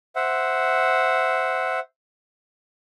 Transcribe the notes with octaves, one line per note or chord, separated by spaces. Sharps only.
C5 E5 F#5